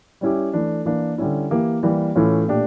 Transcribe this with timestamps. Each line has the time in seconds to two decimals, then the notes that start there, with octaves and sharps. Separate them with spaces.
0.21 G3 C#4 E4 G4
0.53 E3 A3 D4
0.85 E3 A#3 D4
1.18 D3 G3 C#4 E4
1.51 E3 A#3 E4 G4
1.83 E3 G3 A#3
2.15 A2 E3 A3 C#4 F4
2.47 A#2 A3 D4 G4